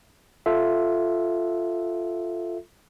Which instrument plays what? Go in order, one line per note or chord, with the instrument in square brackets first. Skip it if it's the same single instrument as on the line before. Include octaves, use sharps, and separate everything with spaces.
[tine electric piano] F4 A4 E5